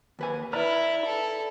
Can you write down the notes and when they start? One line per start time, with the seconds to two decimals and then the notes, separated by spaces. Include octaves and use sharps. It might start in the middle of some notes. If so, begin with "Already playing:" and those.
0.19 D#2 B4 G#5
0.53 E4 B4 D5 A#5 F6
1.05 A4